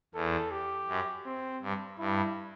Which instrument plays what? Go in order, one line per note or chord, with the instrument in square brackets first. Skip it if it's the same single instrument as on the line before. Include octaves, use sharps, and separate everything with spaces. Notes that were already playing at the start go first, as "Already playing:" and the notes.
[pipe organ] E2 [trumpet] A4
[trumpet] G4
[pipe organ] F#2
[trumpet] C4
[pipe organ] G2
[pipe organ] G2 [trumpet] E4